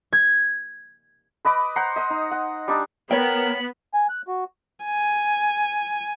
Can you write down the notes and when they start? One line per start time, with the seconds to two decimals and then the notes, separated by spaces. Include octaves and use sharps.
0.13 G#6
1.45 B4 D#5 B5 D6
1.76 C5 F#5 A#5 C6
1.96 D#5 D#6
2.10 D#4
2.31 F#5
2.68 G3 D4 D#4
3.11 B3 A#4 C#5 G5 B5
3.94 G#5
4.09 F#6
4.28 F#4
4.85 G#5